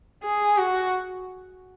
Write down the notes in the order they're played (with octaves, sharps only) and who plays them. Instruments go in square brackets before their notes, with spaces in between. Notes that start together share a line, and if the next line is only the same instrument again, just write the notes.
[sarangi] G#4
F#4